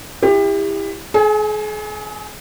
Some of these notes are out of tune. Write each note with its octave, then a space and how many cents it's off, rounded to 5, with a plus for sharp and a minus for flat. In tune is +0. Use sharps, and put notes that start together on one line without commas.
E4 +0 G4 +30
G#4 +40 G#5 -5